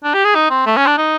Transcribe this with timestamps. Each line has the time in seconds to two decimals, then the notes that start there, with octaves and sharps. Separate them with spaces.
0.04 D4
0.14 G4
0.25 G#4
0.35 D#4
0.50 C4
0.66 A3
0.77 C#4
0.87 D4
0.98 D#4